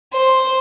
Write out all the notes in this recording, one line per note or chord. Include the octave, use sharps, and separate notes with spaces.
C5